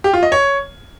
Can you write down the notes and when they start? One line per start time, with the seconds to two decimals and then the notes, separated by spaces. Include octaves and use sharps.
0.04 G4
0.13 F4
0.23 D#5
0.32 C#5